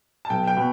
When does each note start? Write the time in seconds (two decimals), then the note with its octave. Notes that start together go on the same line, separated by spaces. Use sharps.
0.25 A5
0.30 B1 G5
0.47 G5
0.57 B2